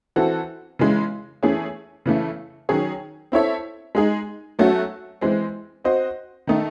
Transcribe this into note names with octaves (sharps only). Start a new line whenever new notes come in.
E3 C4 F#4 A4
C#3 E3 G#3
E3 A3 C#4 E4 G#4
C#3 E3 A3
D#3 F#3 C#4 G#4 C#5
C4 E4 A4 C#5 E5
G#3 D#4 G#4
F#3 A3 C#4 F#4
E3 G#3 C4
C4 F#4 C5 D#5
D#3 A3 D#4